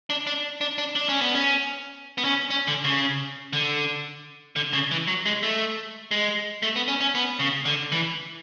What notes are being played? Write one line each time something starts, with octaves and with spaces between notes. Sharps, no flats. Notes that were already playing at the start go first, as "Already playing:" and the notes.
D4
D4
D4
D4
D4
C#4
B3
C#4
B3
C#4
C#4
D3
C#3
D3
D3
C#3
E3
F#3
G#3
A3
G#3
A3
B3
C#4
C#4
B3
C#3
D3
E3